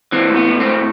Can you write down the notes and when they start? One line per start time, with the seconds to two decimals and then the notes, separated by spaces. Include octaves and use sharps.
0.12 E3 C4
0.30 A2
0.36 B3
0.48 A2
0.60 C4
0.65 A2